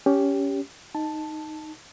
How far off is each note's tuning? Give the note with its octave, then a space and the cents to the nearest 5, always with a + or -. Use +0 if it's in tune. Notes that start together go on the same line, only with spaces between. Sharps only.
C#4 +20 G4 +0
D#4 +0 A5 +0